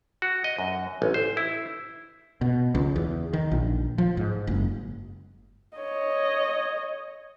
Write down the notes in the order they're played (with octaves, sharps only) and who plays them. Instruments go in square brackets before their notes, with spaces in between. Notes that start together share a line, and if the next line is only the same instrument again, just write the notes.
[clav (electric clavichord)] F#4
D#5
F#2
A1
C5
E4
[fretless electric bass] B2
C#2
E2
D#3
A#1
F3
G#2
F#1
[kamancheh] C#5 D#5